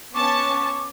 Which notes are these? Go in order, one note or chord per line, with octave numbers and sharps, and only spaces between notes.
B3 C#4 A5 C#6 D6